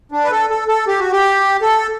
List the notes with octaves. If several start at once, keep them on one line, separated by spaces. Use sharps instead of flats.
D4
B4
A4
A4
A4
G4
F#4
G4
A4